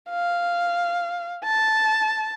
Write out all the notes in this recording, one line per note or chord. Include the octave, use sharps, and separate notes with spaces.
F5
A5